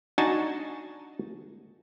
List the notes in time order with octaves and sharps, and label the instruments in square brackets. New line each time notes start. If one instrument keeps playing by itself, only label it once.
[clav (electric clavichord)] D4 D#4 F#4 G#5 A5